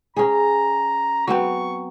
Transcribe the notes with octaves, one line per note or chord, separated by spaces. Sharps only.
C#4 G#4 A#5
F#3 B3 C4 C#6